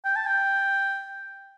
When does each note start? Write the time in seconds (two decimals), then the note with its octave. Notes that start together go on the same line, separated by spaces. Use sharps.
0.05 G5
0.16 A5
0.26 G5